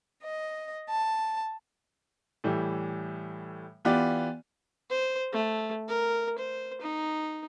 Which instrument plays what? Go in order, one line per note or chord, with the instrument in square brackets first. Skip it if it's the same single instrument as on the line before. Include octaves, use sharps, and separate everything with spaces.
[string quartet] D#5
A5
[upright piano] A2 E3 G3
E3 B3 F4 G4 D5
[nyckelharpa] C5
A3
A#4
C5
D#4